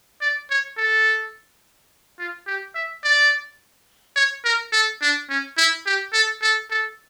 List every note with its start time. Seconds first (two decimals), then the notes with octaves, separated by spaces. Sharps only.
0.21 D5
0.50 C#5
0.77 A4
2.19 F4
2.47 G4
2.75 E5
3.04 D5
4.16 C#5
4.44 A#4
4.72 A4
5.01 D4
5.30 C#4
5.57 E4
5.86 G4
6.13 A4
6.42 A4
6.70 A4